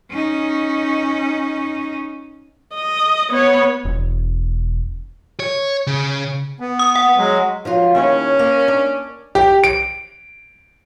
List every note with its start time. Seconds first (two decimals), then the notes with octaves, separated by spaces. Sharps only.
0.11 C#4 D#4
2.74 D#5
3.30 B3 C#5
3.85 E1
5.40 C#5
5.87 C#3
6.60 B3
6.79 D#6
6.96 F#5
7.17 F#3 G#3
7.65 F3 F#3 F4
7.95 D#2 C#4 E4 C#5
8.39 A#3
8.68 D4
9.35 G4
9.64 D7